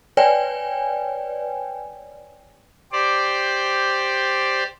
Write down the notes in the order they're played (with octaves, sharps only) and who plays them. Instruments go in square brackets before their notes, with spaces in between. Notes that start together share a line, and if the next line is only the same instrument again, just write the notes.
[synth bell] B4 C#5 D5 G5 G#5
[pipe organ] G4 C5 D5